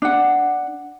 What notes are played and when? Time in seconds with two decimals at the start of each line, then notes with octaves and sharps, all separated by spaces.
0.02 D4 F#5